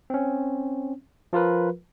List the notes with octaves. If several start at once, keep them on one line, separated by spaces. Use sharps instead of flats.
C4 C#4
F3 F4 A#4 B4